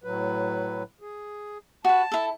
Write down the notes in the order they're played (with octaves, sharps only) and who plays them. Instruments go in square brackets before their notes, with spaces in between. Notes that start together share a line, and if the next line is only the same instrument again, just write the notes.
[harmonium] A2 F#3 B4
G#4
[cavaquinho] F#4 B4 [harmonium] A5
[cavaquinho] E4 A4